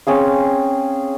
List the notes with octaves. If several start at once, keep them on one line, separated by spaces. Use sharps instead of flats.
C4 C#4 G#4 F5